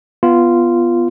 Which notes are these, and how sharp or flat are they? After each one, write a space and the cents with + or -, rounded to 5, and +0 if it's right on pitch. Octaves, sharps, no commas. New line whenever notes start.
B3 +0 F4 -15